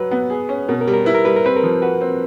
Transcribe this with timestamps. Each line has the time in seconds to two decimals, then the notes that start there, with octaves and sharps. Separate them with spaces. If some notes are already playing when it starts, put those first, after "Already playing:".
Already playing: F#3 B4
0.11 B3
0.30 G#4
0.49 C#4
0.68 B2 A#4
0.81 A#4
0.88 G3
0.94 A#4
1.04 E4 B4
1.14 A#4
1.25 G3 B4
1.36 A#4
1.45 C4 B4
1.57 A#4
1.63 F3
1.82 F#4 B4
2.01 C4